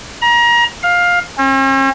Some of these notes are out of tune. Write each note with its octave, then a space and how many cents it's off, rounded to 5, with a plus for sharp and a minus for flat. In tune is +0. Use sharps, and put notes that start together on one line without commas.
A#5 +30
F5 +15
C#4 -45